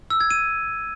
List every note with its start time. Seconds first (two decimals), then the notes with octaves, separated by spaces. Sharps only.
0.10 E6
0.20 G#6
0.31 D#7